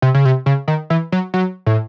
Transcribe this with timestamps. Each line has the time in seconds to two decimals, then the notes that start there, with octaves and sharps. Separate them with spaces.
0.02 C3
0.14 C#3
0.25 C3
0.46 C#3
0.68 D#3
0.90 E3
1.12 F#3
1.34 F#3
1.66 A2